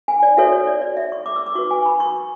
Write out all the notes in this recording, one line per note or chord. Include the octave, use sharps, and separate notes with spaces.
G#5
D5
F#4 A4 C#5 E5
C#5
D5
D5
E5
C#6
D6
E6
D6
F#4 B4 C#6
G#5
B5
C#6